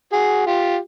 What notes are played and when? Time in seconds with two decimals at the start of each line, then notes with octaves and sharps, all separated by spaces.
0.13 F#4 G#4
0.46 F4 G4